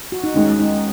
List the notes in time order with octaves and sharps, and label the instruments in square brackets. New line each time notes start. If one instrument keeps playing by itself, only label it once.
[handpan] F#4
D#4
[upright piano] D#2 D#3 G#3 [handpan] C#4
[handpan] D#4